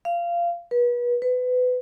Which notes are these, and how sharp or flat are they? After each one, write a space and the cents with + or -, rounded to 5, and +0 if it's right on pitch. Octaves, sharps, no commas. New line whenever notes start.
F5 -20
B4 -35
B4 +25